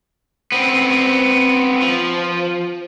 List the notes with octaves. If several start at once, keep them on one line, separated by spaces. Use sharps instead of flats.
B3 C4
F3